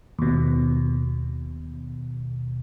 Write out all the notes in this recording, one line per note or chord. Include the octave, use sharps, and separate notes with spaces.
D#2 B2